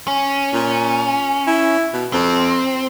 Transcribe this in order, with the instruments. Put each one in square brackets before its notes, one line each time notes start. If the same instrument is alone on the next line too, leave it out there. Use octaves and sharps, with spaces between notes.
[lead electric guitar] C#4
[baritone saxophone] A#2
E4
B2
[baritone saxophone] F2 [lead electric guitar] C4